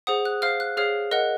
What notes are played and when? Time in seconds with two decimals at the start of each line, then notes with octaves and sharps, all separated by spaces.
0.07 G#4 C5 F#5 D#6
0.25 F#6
0.42 C5 F5 F6
0.60 F#6
0.77 G#4 C#5 F5 F6
1.11 A#4 D#5 F#5 F#6